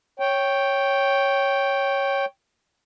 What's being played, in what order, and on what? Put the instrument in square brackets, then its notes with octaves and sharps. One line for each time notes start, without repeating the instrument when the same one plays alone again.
[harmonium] C#5 G5